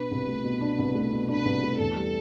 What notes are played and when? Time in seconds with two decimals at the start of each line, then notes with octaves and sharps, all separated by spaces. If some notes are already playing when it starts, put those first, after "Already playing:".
Already playing: B2 D4 B4
0.11 C2
0.28 A3
0.44 B2
0.61 D4
0.79 C2
0.95 A3
1.12 B2
1.28 D4 B4
1.45 C2
1.63 A3
1.79 E2 A4
1.96 G3